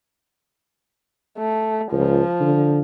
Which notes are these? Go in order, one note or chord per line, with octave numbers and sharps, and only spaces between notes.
A3
C#2 F3
D3